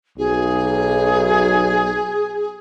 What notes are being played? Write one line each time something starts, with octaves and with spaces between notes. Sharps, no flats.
B1 G#4